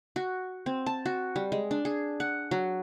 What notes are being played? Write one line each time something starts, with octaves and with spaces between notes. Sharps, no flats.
F#4
C4
A5
F#4
G3
G#3
D4
G#4
F#5
F#3